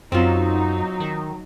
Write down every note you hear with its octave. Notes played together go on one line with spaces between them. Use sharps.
F#2 F#3 C4 D#4 F4
D#3